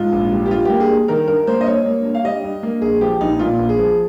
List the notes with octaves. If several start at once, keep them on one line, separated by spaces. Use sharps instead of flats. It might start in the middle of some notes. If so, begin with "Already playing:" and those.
Already playing: G#2 F4
A#1
G3
G4
G2 F4
A#3 G4
G#4
G2
D#3 A#4
G2 A#4
A#3 C5
D#5
G2 C#5
A#3
G2
F5
G3 D#5
G2
A#3
A#1 G#4
F3 G4
A#1 D#4
A#2 F4
A#1
G#4
F3